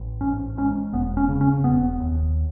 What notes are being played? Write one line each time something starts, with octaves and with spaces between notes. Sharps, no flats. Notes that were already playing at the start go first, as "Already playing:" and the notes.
Already playing: A1
G#2 C#4
G#2 C#4
E1 B3
C#4
C#3
C#4
E1 B3
D#2